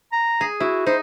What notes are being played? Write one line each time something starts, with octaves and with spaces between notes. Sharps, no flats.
A#5
G#4
E4 F#4
D#4 C5